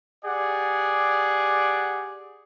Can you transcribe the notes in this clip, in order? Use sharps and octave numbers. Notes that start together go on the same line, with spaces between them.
G4 G#4 D5 F#5